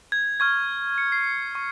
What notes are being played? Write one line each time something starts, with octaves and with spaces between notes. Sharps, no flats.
G#6
C#6 F6 G#6
C#7
C7
C#6